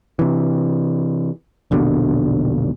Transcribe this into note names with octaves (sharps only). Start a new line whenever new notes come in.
C3 E3
E1 A#1 B2 D3